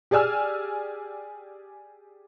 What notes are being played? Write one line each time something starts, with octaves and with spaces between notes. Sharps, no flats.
G4 G#4 D5 G#5 E6 F6